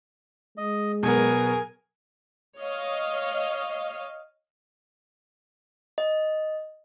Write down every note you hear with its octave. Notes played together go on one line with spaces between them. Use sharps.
G#3 D#5
B2 F#3 B3 G#4 A#4 G#5
C#5 D#5 F5
D#5